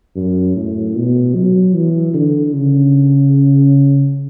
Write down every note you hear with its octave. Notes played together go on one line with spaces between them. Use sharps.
F#2
A2
B2
F#3
E3
D3
C#3